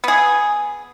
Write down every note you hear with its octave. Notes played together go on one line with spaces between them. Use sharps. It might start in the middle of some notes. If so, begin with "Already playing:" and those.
B3 G#4